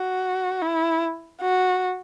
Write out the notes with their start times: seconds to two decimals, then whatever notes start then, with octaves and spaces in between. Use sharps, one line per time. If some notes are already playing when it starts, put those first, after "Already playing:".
Already playing: F#4
0.62 E4
1.42 F#4